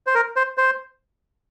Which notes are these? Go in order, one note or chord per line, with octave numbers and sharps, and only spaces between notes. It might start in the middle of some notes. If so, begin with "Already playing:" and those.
C5
A#4
C5
C5